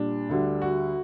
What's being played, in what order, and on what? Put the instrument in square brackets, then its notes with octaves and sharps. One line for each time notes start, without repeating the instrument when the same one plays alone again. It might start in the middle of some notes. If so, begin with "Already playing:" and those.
Already playing: [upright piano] A#2 G3 D4
D2 D3 G3
F#4